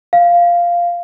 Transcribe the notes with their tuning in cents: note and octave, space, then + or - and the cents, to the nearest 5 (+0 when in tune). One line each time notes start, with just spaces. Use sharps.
F5 -5